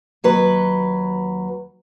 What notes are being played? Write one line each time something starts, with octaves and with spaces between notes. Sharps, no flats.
D#2 F#3 B4